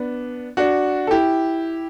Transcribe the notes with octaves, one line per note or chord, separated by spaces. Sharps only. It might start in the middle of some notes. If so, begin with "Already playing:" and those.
Already playing: B3 D4
D4 F#4
A4
E4 G4